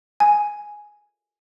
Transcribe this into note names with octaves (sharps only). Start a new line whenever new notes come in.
G#5